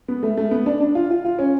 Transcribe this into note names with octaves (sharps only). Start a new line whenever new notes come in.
B3
A3
A3
B3
D4
D4
F4
F4
F4
C#4